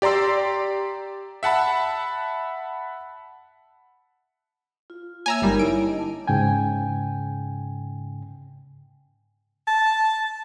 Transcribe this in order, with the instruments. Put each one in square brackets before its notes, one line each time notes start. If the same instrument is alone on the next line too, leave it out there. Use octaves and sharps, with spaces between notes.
[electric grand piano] G4 D5 A#5 C6 E6
E5 F#5 A5 B5
[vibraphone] F4
[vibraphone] A#3 C#5 E5 [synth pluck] G#5 A#5 E6
[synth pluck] G1 G3 [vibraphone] D#4 A#4 G#5
[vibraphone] E4 [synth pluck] D7
[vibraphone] D4 D#5 A5
[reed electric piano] G#2 C#3 G5 G#5
[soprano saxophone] A5